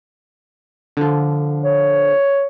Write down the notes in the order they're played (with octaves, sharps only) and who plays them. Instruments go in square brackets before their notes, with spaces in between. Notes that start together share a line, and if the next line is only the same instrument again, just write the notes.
[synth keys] D3 F3
[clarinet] C#5